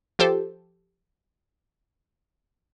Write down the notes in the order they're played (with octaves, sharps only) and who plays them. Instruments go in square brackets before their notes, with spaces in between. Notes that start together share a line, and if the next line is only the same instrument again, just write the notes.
[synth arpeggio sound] F3 G4 A4 C5